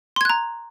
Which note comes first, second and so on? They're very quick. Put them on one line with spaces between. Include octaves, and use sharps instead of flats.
C6 G#6 F#6 A#5